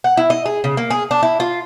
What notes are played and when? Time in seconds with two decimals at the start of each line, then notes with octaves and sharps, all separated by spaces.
0.04 F#5
0.17 E4
0.30 D#5
0.46 G#4
0.64 C#3
0.77 A#3
0.90 G#4
1.11 D4
1.23 E4
1.40 F4